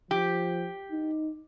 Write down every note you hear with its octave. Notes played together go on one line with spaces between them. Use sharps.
F3 G4
D#4